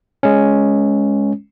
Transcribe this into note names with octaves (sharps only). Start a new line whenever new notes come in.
G#3 C#4